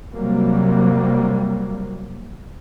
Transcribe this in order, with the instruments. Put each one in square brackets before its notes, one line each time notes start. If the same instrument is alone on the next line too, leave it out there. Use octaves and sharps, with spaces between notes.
[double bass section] C3 F#3 G3 A#3